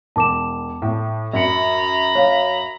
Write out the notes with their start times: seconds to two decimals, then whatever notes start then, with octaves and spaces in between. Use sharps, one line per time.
0.16 E1 A5 D6 E7
0.82 A2
1.33 F#2 A#5 B5 C#7
2.15 C#5 F5